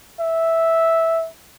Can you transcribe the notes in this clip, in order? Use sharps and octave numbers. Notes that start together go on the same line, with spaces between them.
E5